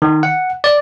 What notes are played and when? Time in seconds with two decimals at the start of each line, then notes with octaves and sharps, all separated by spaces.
0.02 D#3
0.23 F#5
0.64 D5